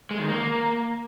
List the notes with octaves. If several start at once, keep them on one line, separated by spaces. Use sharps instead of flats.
G#3
D#3
A#3